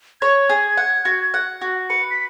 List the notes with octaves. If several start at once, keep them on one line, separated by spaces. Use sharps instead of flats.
C#5 G#6
G#4
F#5
F#4
F#5
F#4
B4 C#7
B6